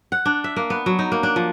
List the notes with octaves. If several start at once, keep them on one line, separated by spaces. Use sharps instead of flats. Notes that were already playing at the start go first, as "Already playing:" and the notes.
F#5
D4
E5
A#3
B3
F#3
D#4
A#3
D4
F3